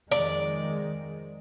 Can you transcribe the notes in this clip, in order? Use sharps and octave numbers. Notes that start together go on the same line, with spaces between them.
F2 D#3 G#3 D5